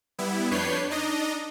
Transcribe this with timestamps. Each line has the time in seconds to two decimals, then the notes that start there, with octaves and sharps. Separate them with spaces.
0.18 G3 B3 E4
0.51 F2 D4 B4 C#5 G6 C7
0.90 D4 D#4 D#5